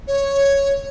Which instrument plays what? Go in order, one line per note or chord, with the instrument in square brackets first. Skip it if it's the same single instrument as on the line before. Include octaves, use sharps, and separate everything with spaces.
[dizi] C#5